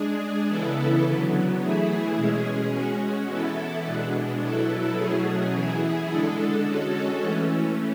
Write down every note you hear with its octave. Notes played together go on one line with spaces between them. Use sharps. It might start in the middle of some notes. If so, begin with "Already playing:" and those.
Already playing: G#3 D4 G#4
C#3 E3 B3 E4 A4
D3 F#3 B3
E3 A3 E4 G#4
B2 G#3 C#4 G#4
G#3 C#4 F#4
E3 B3 E4 A4
B2 G#3 B3 D4
B2 F#3 B3 E4 A4
B2 F#3 A3 C#4 G#4
E3 B3 E4 G#4
D3 G#3 D4 A4
G#3 C#4 F#4 A4
E3 A3 C#4